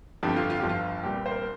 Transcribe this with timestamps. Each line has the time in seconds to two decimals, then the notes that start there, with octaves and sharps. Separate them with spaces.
0.23 G1 F2 D3 F3 G4
0.36 F4
0.50 F4
0.60 G1 G2 F3 G4
0.69 F4
1.03 C2 A#2 G3 G4
1.26 C5
1.31 A#4